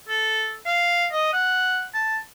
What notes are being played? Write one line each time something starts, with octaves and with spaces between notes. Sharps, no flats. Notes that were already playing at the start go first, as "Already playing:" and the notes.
A4
F5
D#5
F#5
A5